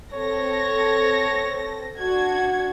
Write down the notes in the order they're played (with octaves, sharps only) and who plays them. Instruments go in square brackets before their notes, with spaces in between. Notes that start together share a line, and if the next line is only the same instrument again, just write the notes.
[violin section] C4 A4 A#6 [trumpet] C#5
[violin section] D4 F#4 G#6